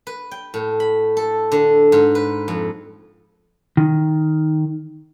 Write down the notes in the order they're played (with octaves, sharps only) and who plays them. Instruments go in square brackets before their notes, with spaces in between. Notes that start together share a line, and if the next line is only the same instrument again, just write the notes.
[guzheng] B4
G5
A2
B5
A4
D3
G#2
B4
F2
[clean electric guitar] D#3